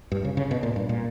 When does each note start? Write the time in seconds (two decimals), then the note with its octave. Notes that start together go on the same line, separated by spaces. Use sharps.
0.12 G2
0.25 C#3
0.37 C#3
0.51 B2
0.63 A#2
0.76 G2
0.89 A#2